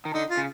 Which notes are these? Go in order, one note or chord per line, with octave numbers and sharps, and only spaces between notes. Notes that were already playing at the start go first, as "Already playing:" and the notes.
D#3
D3 D#4
F4
C#3